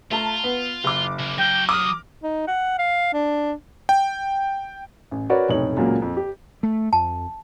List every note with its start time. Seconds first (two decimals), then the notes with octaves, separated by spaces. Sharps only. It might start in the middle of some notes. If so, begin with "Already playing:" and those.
0.11 A3 F4 A5 A#5
0.44 B3
0.84 F#1 D6
1.19 C#3 A#3
1.38 F#3 F5 G5 A#6 F#7
1.69 D6 D#6 F6
2.23 D#4
2.48 F#5
2.79 F5
3.14 D4
3.89 G5
5.11 A1
5.30 F#4 A#4 B4 C#5 D5
5.49 F1 B1 A2 D#4 C#5 F#7
5.76 C#2 A#2 F#3 A#3
6.02 F2
6.17 G4
6.63 A3
6.93 F2 A5